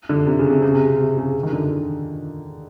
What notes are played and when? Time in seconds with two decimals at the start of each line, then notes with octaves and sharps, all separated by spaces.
0.09 D3
0.27 C3
0.39 C#3
0.50 C3
0.62 C#3
0.74 C3
0.99 C3
1.17 C#3
1.43 D#3
1.53 D3